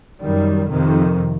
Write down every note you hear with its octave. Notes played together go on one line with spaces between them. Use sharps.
F#2 D#3 G3
F2 C3 D#3